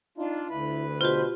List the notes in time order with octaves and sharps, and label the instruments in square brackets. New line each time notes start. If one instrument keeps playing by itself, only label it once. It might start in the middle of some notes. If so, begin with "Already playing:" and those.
[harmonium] D4 F4 [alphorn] D#4
[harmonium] D2 B4 [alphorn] E4
[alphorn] B2 [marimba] F4 G4 [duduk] C5